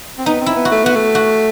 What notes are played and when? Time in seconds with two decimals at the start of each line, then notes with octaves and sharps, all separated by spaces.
0.18 C4
0.26 B3 D#4
0.41 C4
0.46 E4
0.56 B3
0.65 F#4
0.71 A3
0.84 B3 F#4
0.96 A3
1.15 F#4